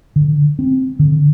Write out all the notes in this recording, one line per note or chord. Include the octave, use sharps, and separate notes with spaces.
D3
C4
D3